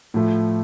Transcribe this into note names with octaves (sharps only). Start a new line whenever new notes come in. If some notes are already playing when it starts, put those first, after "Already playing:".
A2 F3 A3